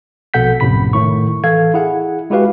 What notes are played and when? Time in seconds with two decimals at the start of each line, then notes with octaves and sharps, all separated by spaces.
0.34 A#1 B2 A4 F#5 G6 B6
0.60 A#1 F#2 A2 C3 B5 B6
0.93 A2 D#3 C#6
1.44 E3 A4 F5 G#6
1.74 E4 G#4 F#5
2.30 G#3 E4 F#4 G4 B4 F5